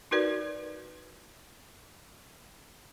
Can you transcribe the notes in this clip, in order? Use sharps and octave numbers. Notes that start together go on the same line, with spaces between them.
D#4 F#4 A#4 B4 D5